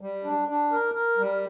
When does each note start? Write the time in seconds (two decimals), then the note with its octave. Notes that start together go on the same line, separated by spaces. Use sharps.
0.01 G3
0.24 D4
0.48 D4
0.72 A#4
0.94 A#4
1.18 G3